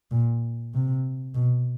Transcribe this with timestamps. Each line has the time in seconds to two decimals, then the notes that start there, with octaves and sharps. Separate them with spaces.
0.11 A#2
0.74 C3
1.34 B2